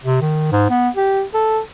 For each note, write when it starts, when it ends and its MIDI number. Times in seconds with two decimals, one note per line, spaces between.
0.05 0.21 48
0.21 0.51 51
0.52 0.66 44
0.70 0.89 59
0.96 1.23 67
1.34 1.60 69